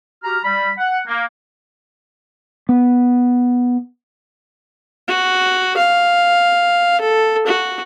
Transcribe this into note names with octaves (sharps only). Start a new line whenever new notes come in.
F#4 G4 A#5 F6
G3 B5
F#5
A#3
B3
F#4
F5
A4
F#4